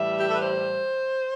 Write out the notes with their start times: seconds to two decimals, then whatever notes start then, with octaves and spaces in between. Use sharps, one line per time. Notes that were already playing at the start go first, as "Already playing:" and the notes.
Already playing: A2 E3 G3 E5
0.19 G4
0.27 A4
0.34 B4
0.41 C5